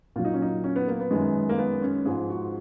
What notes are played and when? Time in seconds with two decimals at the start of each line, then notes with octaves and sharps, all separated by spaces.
0.16 A#2 F#3 F4
0.25 D#4
0.34 C#4
0.42 D#4
0.64 C#4
0.76 B3
0.88 A#3
1.00 B3
1.11 F#2 D#3 G#3
1.49 A#3
1.58 B3
1.82 C#4
2.05 G#2 F3 G#3 G#4
2.30 F#4